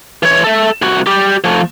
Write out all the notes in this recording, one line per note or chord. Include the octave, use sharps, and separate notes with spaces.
E3 C#5
A4 E5
C2 F#4
G3 G4
F3 A3